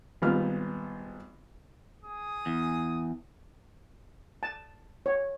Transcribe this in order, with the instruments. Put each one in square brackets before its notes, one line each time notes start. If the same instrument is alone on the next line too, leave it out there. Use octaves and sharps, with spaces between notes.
[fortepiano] G#1 A#2 G3 B3 F4 F6
[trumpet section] G#4 D#6
[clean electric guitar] E2
[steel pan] A5
C#5